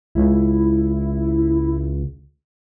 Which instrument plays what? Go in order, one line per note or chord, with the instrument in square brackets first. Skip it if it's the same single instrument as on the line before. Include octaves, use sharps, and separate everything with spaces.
[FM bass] C#2 [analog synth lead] E4